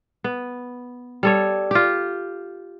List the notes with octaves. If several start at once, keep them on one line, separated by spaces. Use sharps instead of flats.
B3
G3 A4 C#5
F4 G4